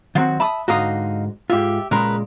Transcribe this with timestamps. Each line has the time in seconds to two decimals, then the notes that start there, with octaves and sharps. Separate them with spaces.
0.15 D#3 F#3 C4 F4 F#4
0.40 E5 A5 B5 D6 D#6
0.68 G#2 D3 D#4 F#4 F5 D#6
1.50 G#2 F4 G4 E5
1.91 A#2 C#3 G#3 A#4 B4